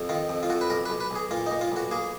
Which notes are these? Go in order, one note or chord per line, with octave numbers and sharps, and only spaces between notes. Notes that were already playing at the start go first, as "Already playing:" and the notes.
Already playing: F2
D#3 F4
F2
F4
F2 F#4
B4
B1 A#4
B4
B1
B4
B1 G#4
A#2 F4
D#4
A#2
F4
B1 F#4
A#3 G#4